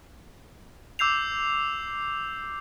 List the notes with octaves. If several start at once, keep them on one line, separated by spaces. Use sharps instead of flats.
D6 E6 G6 C7 F7